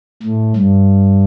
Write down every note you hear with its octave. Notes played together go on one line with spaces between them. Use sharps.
A2
G2